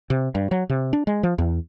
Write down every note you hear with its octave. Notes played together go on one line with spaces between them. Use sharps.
C3
G2
F#3
C3
D4
G#3
F3
E2